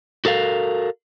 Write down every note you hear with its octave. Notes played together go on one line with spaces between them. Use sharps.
F#4 A4 A#4 F5